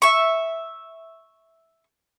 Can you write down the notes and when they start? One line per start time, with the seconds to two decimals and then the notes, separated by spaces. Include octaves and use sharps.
0.02 E5 C#6